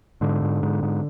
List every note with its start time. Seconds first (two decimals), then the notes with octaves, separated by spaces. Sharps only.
0.21 G#2 D3
0.42 G#2
0.63 G#2
0.83 G#2